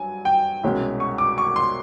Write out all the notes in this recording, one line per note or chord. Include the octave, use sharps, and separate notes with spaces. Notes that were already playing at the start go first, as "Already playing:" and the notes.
Already playing: G2 F#3 G#5
G5
C2 B2 G#3 C#4
C#6
D6
C#6
C6